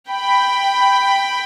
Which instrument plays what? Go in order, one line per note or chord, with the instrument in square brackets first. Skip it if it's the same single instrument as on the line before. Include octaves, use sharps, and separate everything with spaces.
[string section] G5 B5